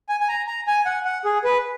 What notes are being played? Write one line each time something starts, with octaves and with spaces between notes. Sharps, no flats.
G#5
G#5
A#5
A#5
G#5
F#5
F#5
G#4
B4